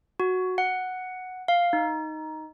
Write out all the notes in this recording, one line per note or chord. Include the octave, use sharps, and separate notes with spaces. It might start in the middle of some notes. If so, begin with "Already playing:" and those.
F#4
F#5
F5
D#4